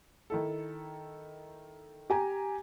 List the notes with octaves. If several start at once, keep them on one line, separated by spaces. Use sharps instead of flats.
D#3 E4 A4
G4 G#5 A#5